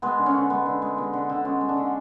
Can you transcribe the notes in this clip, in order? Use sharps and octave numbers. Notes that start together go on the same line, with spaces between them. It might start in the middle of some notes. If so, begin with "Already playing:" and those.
G#3 B3
D3
C#4
D3
G#3 B3
D3
G#3
G#3 B3
D3
D3
G#3 C#4
G#3
D4
D3